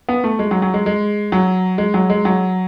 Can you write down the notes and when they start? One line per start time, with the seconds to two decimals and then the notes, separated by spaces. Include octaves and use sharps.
0.09 B3
0.24 A3
0.39 G#3
0.51 F#3
0.62 F#3
0.74 G#3
0.86 G#3
1.32 F#3
1.78 G#3
1.94 F#3
2.10 G#3
2.25 F#3